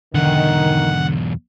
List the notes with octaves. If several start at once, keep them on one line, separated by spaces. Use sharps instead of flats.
B1 E2 D3 D#3 F#5